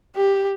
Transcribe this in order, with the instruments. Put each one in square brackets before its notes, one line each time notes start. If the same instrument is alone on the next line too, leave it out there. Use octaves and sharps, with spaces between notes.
[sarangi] G4